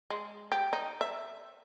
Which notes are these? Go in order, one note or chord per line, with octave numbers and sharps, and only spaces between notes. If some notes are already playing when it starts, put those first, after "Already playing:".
G#3
G4
D#4
E5